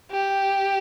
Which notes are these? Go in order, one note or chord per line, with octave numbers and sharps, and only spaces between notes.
G4